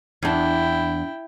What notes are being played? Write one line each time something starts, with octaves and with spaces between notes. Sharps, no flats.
E2 D4 E4 G5